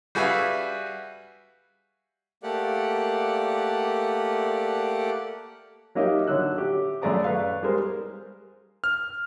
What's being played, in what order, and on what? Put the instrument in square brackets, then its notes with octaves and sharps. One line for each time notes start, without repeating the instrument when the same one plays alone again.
[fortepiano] G3 F#4 G#4 B4 E5 F5
[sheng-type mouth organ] A3 A#3 G4 D5 F#5
[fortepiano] F#3 A#3 D#4 G4 D#5 E5
D3 F#3 E6 F#6
G4 E5
F#2 A3 G#4 D5 A#5 D6
B4 F5 C#6
G3 G#3 G#4 A#4 C5
[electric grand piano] F6